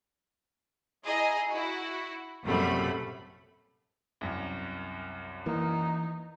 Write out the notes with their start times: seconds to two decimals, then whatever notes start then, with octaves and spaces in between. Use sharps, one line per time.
1.04 E4 G#4 D#5 A#5
1.50 E4 F#4
2.44 A#1 F#2 C3 G3 A3 B5
4.21 C2 F#2
5.46 E3 A#3 D#4